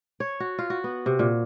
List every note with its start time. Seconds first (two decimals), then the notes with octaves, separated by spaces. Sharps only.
0.20 C#5
0.40 F#4
0.58 F4
0.70 F#4
0.84 B3
1.06 C3
1.19 A#2